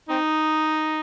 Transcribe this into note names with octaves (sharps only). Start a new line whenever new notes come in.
C4 D#4